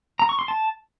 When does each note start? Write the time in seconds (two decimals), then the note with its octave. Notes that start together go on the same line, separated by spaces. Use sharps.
0.19 A#5
0.29 C#6
0.39 C6
0.48 A5